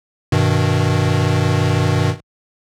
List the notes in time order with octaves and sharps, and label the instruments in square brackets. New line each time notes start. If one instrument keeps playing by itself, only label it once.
[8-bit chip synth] G2 B2 D#3